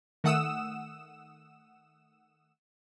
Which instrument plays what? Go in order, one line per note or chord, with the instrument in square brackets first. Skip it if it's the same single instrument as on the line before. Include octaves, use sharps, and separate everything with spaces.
[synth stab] D#3 A3 F#5 D#6 E6 E7